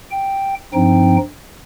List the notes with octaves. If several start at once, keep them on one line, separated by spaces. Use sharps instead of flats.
G5
G2 F3 C4 D#4 G5